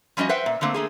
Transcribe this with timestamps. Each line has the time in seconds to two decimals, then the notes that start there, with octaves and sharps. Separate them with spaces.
0.17 F3 G3 C#4 F#4 D#5
0.29 B4 C5 E5 F#5 G5
0.46 A#2
0.61 D3 A3 A#3 C4
0.74 A3 A#3 G#4